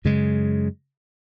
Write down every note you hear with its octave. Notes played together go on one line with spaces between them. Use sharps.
F#2 C#3 G#3